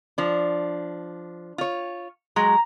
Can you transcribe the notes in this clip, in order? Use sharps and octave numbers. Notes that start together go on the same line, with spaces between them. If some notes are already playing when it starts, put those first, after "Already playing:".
F3 D4
F4 C#5
F#3 G#3 A#5